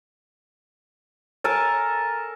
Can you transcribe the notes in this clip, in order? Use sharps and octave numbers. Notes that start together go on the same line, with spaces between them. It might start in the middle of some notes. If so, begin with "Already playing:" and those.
A4 A#4 G#5 A5